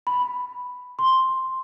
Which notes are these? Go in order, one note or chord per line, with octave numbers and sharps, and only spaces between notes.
B5
C6